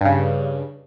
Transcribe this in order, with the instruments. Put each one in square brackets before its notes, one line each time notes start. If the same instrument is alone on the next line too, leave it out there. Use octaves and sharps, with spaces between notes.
[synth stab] G2 C#3